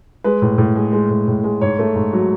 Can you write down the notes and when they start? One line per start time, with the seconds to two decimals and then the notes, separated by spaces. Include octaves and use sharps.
0.24 G#3 B4
0.42 A2
0.58 A2
0.76 G#3
0.92 G#3
1.10 A2
1.28 A2
1.44 G#3
1.61 G#2 C#5
1.79 A3
1.95 G#2
2.13 F#3